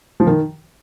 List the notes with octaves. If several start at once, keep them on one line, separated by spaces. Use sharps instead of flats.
F3
D#3